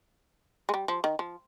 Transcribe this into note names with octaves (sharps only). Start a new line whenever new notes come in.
G#3
G3
F3
D#3
F3